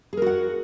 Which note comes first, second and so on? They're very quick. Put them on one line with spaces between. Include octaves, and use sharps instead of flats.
G#4 A#4 F#4 F#5